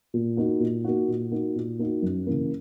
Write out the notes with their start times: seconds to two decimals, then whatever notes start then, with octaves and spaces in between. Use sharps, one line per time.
0.14 A#2
0.37 A#3 D#4 F#4
0.60 A#2
0.84 A#3 D#4 F#4
1.08 A#2
1.32 A#3 D#4 F#4
1.56 A#2
1.79 A#3 D#4 F#4
2.02 F#2
2.27 C#3 E3 A#3